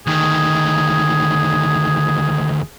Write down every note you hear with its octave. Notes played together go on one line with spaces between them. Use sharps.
D2 D#3 G#4